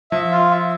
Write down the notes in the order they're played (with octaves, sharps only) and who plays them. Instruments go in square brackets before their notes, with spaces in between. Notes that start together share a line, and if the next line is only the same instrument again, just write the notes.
[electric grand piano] F3 [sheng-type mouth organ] E5
[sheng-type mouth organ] F4
E5